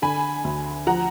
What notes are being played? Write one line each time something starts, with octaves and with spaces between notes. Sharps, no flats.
D3 G#5 B5
D2
F3 F#5 A#5